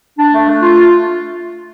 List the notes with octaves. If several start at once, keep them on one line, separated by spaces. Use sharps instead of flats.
D4
A3
A3
F4